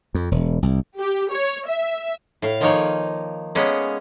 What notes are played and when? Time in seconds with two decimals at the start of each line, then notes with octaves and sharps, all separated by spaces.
0.15 F2
0.31 E1
0.62 C2
0.99 G4
1.32 C#5
1.67 E5
2.42 A2 F5
2.61 D#3 F3 A#3 D#4 C#5
3.55 G#3 A#3 B3 C#4